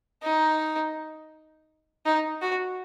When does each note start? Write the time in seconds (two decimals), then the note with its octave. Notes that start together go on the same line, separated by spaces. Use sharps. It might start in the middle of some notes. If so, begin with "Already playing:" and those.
0.23 D#4
2.06 D#4
2.42 F#4